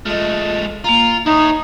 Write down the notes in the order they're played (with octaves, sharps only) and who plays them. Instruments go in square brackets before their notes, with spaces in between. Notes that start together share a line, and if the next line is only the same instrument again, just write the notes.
[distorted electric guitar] G#3 A3 [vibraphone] F4 D#5
[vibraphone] A#3 A#5 [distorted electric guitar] F4
[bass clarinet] D#4 [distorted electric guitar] E4 C#5 [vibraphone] D#6